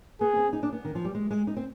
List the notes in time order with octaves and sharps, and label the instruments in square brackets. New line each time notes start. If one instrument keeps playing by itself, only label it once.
[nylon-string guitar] B3 [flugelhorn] G#4
[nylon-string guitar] C4
D#4
D4
B3
D#3
F3
G3
G#3
G#3
D#4
C4